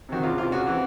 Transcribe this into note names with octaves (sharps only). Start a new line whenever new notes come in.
C3 D#3 F#4
C#2 F4
C3 E3 F4
C#2 F#4
C3 E3